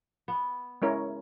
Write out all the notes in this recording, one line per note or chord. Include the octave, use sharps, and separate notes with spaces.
B3
G#3 C#4 E4 A#4 C#5